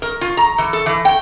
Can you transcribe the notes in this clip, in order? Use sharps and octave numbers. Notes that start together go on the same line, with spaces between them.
A#4
F4
A#5
E3
A4
E3
G5